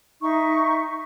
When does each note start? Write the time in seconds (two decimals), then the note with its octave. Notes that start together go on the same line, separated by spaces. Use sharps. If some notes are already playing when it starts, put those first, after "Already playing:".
0.22 D#4 E5 C#6